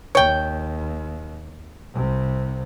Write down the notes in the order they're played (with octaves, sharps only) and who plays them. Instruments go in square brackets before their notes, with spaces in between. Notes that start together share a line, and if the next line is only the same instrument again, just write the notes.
[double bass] D#2 [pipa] C#5 G5
[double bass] C2 C3